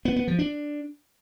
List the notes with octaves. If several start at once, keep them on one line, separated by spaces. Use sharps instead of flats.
B3
B3
F3
D4